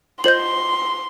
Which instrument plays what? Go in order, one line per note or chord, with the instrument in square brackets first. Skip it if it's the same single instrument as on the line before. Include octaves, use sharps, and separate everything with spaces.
[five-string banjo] F4 C5 D#5 [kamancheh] C6 [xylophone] G6 F#7